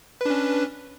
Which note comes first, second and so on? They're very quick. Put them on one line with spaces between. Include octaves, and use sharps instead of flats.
B4 D4 C#4